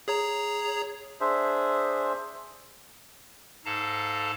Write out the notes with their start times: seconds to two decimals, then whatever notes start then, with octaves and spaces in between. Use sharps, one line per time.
0.08 G#4 C#5 A#5
1.21 D4 G#4 C5 E5
3.65 G#2 A4 F5 A5 A#5